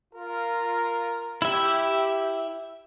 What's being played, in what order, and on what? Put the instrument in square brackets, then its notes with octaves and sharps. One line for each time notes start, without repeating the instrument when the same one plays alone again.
[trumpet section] F4 A#4
[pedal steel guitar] E4 E5 [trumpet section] G4